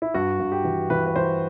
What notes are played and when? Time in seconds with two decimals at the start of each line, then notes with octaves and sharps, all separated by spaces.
0.02 E4
0.14 G2 F#4
0.40 G2
0.52 G4
0.64 E3
0.90 E3 B4
1.06 B4
1.16 E3 C5